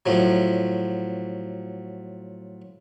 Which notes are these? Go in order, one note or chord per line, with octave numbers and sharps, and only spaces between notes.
A2 F3 F#3